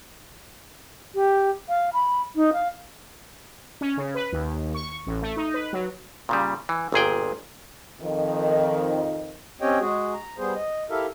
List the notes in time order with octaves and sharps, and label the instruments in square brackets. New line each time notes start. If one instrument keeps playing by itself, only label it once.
[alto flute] G4
F5
B5
D#4
F5
[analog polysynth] C#4
C#3
B4
D#2
C#6
A1
A3
D#4
B4
F#3
[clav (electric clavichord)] A#2 C#3 G3
E3
G1 A#2 G#4 G5
[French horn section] F2 D#3
[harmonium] C4 C#4 G4 C#5 D#5 G5
G#3 F#4 G#4
A#5
G3 B3 G#4 C5
D#5
E4 G4 A4 A#4 E5 F5